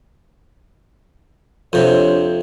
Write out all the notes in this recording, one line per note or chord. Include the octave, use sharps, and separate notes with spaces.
F2 C3 D4 C5 C#5